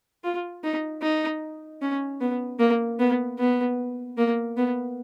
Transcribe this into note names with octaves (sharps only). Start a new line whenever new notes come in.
F4
D#4
D#4
C#4
B3
A#3
B3
B3
A#3
B3